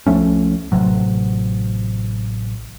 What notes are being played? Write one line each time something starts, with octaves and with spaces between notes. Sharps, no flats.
C2 F3 A3 C#4
A1 C3 F#3